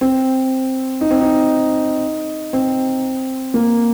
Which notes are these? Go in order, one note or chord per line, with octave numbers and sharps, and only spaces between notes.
C4
D#4
C4
D#4
C4
A#3